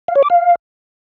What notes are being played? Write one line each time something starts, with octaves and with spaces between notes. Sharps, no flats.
F5
C#5
D6
F5